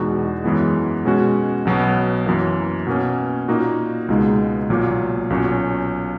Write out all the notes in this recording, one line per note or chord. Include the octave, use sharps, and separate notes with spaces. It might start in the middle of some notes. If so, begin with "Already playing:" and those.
Already playing: E2 B2 G#3 D#4 F#4
F#2 E3 G#3 B3
B2 G#3 C#4 F#4
B1 B2 F#3 B3
F#2 E3 A#3
B2 A#3 C#4
A#2 A#3 D#4 F#4
C#2 B2 G#3 D#4
B1 A#2 F#3 A#3
B1 A#2 F#3 C#4 F#4